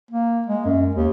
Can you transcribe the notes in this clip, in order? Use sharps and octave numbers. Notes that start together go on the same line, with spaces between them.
A#3
G#3
F#2
D#2